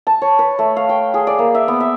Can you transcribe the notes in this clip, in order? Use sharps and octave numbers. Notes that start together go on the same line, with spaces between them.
A5
C#5
B4
A3
F5
G5
G#4
D5
A#3
E5
B3
E5